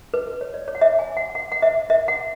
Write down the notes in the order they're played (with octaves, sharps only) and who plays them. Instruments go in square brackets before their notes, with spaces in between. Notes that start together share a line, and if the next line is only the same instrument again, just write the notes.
[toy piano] B4
B4
C#5
D5
C#5
F#5
E5
G#5
F#5
F#5
F#5
E5
E5
F#5